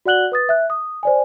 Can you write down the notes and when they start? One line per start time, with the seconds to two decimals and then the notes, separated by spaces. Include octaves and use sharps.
0.06 F#4 D5 F#5 F#6 F#7 G7
0.32 B4 D#6 A6
0.49 E5 F#6
0.70 D#6
1.03 C5 D5 G#5